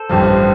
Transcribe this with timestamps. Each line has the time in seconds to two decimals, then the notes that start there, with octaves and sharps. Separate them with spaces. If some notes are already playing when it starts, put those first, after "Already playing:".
Already playing: A4 C5
0.09 A1 G2 F3